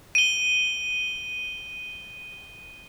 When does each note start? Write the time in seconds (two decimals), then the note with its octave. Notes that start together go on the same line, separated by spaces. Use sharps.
0.15 D#7 G7